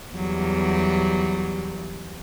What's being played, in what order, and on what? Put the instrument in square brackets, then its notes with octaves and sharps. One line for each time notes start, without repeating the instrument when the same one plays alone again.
[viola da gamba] E2 F#3 G3